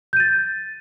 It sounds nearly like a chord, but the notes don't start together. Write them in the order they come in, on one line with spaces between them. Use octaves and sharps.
G6 D#7 A6